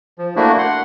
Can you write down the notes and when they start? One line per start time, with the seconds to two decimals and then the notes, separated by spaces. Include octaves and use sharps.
0.18 F3
0.36 A3 A#3 D4 E4 F#4
0.58 F#5 C6